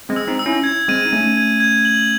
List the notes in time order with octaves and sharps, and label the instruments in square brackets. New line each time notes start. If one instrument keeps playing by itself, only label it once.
[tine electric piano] G#3 C4
[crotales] E6
[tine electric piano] C4 D#4
[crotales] E6
[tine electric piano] C#4 E4
[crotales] G#6
[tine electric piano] G#3 C4 [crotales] D#7
[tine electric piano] D#4
[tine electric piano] A3 C#4 [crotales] D#7
[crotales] G#6
G#6
F#7